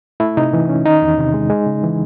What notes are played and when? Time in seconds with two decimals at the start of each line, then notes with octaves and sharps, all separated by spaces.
0.20 A3 E4
0.37 C3 D#4
0.53 E3
0.69 C#4
0.85 D#3 D#4
1.02 E2
1.18 C3
1.34 G#3
1.50 G#3
1.66 C#3
1.83 E3